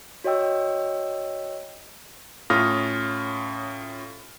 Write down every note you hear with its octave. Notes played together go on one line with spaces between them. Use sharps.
F#4 C#5 D#5 G5 E6
A2 C#4 F4 D#6 F6 A#6